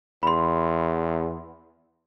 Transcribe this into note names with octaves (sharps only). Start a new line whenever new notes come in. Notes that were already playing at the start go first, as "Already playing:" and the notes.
E2 B5 C6